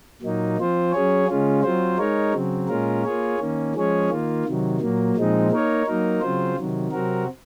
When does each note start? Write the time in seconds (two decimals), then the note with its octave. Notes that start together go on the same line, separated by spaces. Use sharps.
0.22 A#2 F#3 A#3 D#4
0.58 F3 C4 F4 C5
0.92 F#3 C#4 G#4 C#5
1.28 C#3 G#3 C#4 F4
1.63 F#3 C4 F4 C5
1.98 G#3 D#4 A#4 C#5
2.33 C#3 F#3 C4
2.68 A#2 G#3 C#4 F4 A#4
3.04 A#3 F4 G#4 C#5
3.39 D#3 A#3 C#4
3.75 F3 G#3 C#4 G#4 C#5
4.09 D#3 A#3 F4
4.45 C3 D#3 F#3
4.80 A#2 F#3 A#3
5.16 A#2 F3 G#3 C4 D#4
5.51 A#3 D#4 A#4 C#5
5.86 F#3 A#3 D#4 A#4
6.21 C#3 F#3 C4 F4 C5
6.56 C3 D#3 F#3
6.92 C3 F#3 C4 F#4 A#4